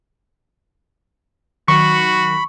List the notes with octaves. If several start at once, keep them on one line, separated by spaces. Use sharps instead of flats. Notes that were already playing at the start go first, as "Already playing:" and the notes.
D#3 F#3 F#4 B5 C#6